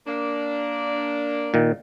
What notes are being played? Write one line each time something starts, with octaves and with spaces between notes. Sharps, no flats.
A#3 D4
A#2 D#3